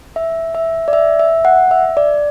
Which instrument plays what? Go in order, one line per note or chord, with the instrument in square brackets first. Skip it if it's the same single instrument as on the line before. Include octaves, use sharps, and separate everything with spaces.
[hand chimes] E5
E5
D5
E5
E5
F#5
E5
D5